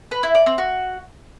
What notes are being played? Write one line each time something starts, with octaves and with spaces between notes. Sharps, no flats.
B4
E4
D5
C4
F#4